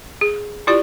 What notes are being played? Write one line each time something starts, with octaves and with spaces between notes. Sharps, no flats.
G#4
E4 F4 G4 D5